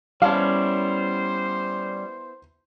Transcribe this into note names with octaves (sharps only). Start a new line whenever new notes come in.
G3 B3 C#4 E4 C5 F5 A5